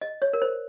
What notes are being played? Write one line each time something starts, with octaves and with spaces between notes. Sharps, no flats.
D#5
C#5
A#4
C5